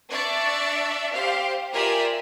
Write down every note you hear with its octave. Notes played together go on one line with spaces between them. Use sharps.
D4 D5 E5 C#6 A6
G4 C5 F5
F4 G4 A#4 D5 E5 G#5